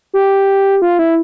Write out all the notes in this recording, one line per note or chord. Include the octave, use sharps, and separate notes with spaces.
G4
F4
E4